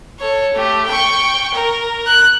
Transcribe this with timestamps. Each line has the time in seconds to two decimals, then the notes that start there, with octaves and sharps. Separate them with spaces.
0.20 A4 C#5
0.54 A3 G4
0.87 G5 C#6
1.54 A#4
2.07 F#6